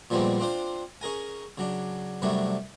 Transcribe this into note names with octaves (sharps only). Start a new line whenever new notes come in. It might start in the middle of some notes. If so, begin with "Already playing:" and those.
A#2 F3 G3 G#3 B3 C4
C4 D4 F4 C5
C#4 G#4 A#4 G#5
C#3 F#3 D4
F#2 C3 F#3 G3 A3 D4